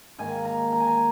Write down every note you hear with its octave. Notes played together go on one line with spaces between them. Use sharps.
G#2 D#3 A#3 G#5
A#5
A#5
G#5
A#5